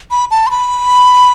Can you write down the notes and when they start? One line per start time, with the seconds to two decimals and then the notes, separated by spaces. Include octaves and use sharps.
0.11 B5
0.31 A5
0.47 C6
0.51 B5